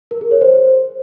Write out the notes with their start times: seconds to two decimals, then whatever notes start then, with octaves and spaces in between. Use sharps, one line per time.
0.11 A#4
0.21 G#4
0.31 C#5
0.41 C5